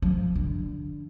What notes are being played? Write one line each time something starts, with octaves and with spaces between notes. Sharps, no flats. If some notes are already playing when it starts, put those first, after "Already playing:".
F3
D3